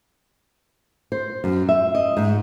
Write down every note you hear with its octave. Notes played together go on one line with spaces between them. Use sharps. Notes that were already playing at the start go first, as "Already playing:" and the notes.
C5
F#2
E5
D#5
G#2